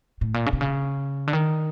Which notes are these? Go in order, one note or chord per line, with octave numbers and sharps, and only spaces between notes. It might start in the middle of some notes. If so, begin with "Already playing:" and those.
A2
A#2
C#3
C3
C#3
D3
D#3